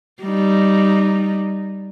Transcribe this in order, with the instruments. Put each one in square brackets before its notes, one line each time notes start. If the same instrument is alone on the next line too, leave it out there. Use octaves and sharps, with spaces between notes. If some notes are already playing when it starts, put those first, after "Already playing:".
[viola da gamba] G3 D#4